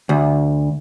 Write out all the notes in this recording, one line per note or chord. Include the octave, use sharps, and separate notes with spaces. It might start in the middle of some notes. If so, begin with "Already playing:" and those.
D2